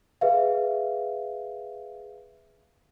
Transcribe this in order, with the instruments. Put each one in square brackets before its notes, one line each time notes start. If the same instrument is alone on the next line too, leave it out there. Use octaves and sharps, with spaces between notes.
[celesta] G#4 B4 E5 F5